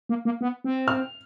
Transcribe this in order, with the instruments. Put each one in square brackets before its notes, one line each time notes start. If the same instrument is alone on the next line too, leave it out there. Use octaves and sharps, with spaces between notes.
[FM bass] A#3
A#3
B3
C4
[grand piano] F6